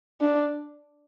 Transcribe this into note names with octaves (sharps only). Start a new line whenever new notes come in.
D4